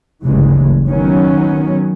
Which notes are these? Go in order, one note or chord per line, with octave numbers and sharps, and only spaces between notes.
F#1 D2 G2 C#3 E3 G#3
D#3 F#3 B3 C#4